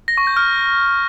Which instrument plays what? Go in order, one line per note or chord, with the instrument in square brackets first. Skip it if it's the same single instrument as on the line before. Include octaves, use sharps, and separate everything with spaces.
[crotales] A#6
C#6
G6
F6